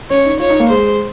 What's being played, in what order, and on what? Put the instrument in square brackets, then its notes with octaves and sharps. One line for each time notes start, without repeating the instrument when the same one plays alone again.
[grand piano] C#4 [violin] C#5
[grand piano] D#4
[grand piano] F4 [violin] C#5
[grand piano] D#4
A#3
[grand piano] G#3 [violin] C5